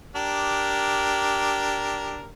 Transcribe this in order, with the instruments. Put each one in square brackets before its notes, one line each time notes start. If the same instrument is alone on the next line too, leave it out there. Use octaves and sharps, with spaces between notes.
[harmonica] D4 G4 A#4